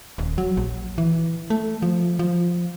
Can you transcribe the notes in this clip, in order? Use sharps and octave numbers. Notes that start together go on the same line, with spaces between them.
D#1
F#3
A#1
E3
A3
F3
F3